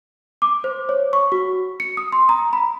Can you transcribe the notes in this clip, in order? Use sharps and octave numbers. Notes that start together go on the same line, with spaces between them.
D6
C5
C#5
C#6
F#4
C#7
D#6
C6
A#5
B5